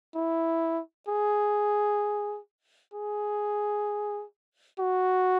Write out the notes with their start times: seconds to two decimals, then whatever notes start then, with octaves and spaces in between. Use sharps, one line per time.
0.15 E4
1.08 G#4
2.94 G#4
4.80 F#4